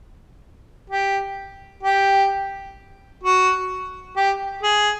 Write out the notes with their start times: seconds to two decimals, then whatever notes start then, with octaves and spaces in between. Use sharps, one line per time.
0.90 G4
1.83 G4
3.23 F#4
4.16 G4
4.63 G#4